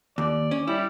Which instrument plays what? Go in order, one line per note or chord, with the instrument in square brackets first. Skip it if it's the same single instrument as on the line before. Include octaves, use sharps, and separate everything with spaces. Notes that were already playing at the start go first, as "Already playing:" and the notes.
[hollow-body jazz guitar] D#2 [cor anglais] D5
[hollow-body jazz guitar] C#4
[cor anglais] G3 [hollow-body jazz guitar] E4